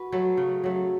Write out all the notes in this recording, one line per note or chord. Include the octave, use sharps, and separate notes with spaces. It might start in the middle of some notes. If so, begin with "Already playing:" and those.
Already playing: F#4 B4
F#3 A3
C#3
F#3 A3